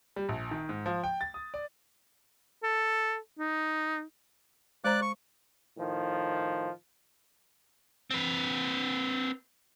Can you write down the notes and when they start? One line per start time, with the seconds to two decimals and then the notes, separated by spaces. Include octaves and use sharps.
0.16 G3
0.29 A#1
0.51 D#3
0.69 G#2
0.86 F3
1.04 G5
1.21 A6
1.34 D#6
1.54 D5
2.63 A4
3.39 D#4
4.84 G#3 C5 D5 A#5 D6 F#6
5.02 C#6
5.77 A2 D#3 F3
8.11 C4 B4